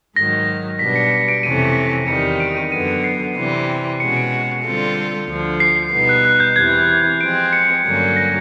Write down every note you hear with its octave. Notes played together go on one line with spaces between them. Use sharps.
G#2 D#3 F#3 A#6
B2 G3 B3 D4 B6
C#7
C#7
D7
F2 C3 E3 A3 C#4 D#7
E2 C3 D#3 G3 C#7
D7
D#7
F#2 D3 F#3 B3 D#7
C#7
C7
C3 E3 G3 C4
B2 G#3 C#4 F#4 C#7
D7
C#7
D3 G3 C4 F4 A4
D2 D3 F3
C7
B2 G3 B3 D#4
F#6
F#6
G6
E2 C3 E3 G#6
F3 G#3 C4 D7
C#7
G2 D3 F#3 A#3 C#4
A#6